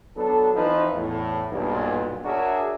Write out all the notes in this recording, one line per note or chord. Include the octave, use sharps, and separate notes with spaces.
F#3 B3 D4 A4
E3 F3 C4 D#4 B4
E2 A2
B1 G2 A#2
D4 F#4 G#4 A#4 C#5 E5